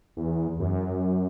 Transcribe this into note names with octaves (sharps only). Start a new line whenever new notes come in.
E2
F#2